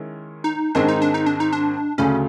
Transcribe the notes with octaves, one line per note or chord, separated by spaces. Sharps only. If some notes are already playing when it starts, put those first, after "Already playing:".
Already playing: D#3 G#3 C#4 E4
D#4
G#2 D#3 G#3 C4 D4
D#4
D4
D#4
D4
D#4
D4
D2 C#3 F#3 A3 C#4